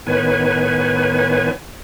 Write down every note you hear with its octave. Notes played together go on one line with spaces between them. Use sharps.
A2 D#3 B3 B4 C#5 G#5